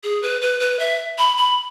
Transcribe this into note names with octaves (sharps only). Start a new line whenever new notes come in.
G#4
B4
B4
B4
E5
B5
B5